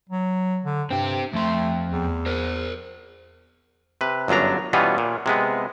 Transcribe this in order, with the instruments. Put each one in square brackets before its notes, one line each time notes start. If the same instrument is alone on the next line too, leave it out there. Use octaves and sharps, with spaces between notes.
[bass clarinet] F#3
D3
[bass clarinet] G2 [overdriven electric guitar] C4 G4
[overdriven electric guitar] F2 C6 [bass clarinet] A3
[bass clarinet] E2
[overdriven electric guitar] A#4 C5
[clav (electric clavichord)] C3 B4
G1 F#2 F#3 D4 A#5
B2 E3 G3 B3 C#4 F4
A#2
C3 G#3 B3